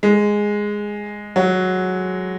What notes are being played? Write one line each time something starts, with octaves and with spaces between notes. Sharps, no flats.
G#3
F#3